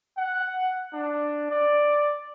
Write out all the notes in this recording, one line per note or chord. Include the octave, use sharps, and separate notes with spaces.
F#5
D4
D5